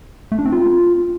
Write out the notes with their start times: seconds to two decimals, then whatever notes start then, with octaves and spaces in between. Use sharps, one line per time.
0.32 A3
0.39 D4
0.46 C4
0.52 F4